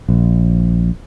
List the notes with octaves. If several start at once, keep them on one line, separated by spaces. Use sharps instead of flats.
A#1